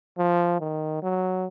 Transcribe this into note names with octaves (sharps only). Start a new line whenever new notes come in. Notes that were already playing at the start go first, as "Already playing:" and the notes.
F3
D#3
F#3